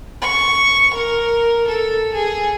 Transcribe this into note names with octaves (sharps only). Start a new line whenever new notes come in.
C#6
A#4
A4
G#4